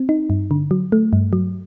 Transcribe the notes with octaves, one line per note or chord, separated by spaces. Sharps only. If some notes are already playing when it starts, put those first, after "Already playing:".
Already playing: C4
D#4
G2
D3
F#3
A3
G2
F#3